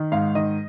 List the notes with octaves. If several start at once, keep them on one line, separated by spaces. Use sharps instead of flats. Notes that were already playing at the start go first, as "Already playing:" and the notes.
Already playing: D#3
G#2 F5
D#3 D#5